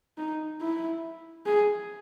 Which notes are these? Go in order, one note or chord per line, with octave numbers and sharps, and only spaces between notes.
D#4
E4
G#4